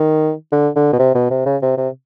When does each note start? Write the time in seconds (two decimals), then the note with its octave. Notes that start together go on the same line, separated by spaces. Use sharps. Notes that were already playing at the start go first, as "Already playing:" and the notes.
Already playing: D#3
0.52 D3
0.76 D3
0.93 B2
0.99 C3
1.15 B2
1.31 C3
1.46 C#3
1.62 C3
1.77 C3